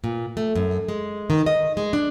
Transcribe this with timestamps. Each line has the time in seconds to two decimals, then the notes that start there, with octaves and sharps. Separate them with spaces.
0.04 A#2
0.37 A3
0.55 F#2
0.88 G#3
1.30 D#3
1.46 D#5
1.77 G#3
1.93 D4